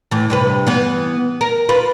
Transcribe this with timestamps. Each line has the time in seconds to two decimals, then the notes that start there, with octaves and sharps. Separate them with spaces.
0.11 A2 E3
0.30 G2 C3 B4
0.67 E3 B3
1.41 A#4
1.69 F4 B4